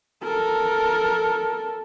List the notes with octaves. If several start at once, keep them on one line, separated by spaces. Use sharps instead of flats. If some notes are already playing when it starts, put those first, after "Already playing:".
A4 A#4